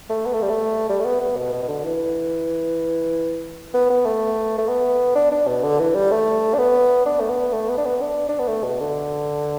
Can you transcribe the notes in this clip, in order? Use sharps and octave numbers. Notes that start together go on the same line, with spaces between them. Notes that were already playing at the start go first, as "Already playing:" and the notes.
A3
B3
A3
G3
A3
G3
A3
B3
B3
B2
B2
B2
D3
E3
B3
B3
A3
A3
B3
D4
D4
B2
D3
E3
G3
A3
D4
B3
D4
A3
B3
A3
B3
D4
B3
D4
D4
B3
A3
B2
D3